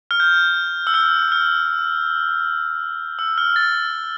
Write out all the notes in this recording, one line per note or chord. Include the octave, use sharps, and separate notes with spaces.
F6
G6
E6
F6
F6
E6
F6
A6